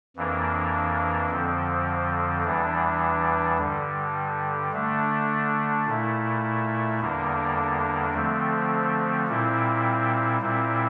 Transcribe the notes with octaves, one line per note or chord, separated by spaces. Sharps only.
F2 E3 A#3 D4
F2 D3 F3 C4
E2 E3 G3 D4
G2 D3 G3
D3 A3 D4
A#2 A3 E4
E2 D3 G3 A#3 D4
D3 F3 A3 C4
A#2 G3 C4 E4
A#2 G3 C4 E4